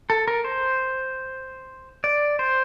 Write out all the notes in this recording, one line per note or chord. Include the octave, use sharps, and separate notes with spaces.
A4
A#4
C5
D5
C5